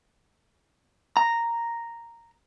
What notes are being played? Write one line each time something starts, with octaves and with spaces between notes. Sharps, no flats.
A#5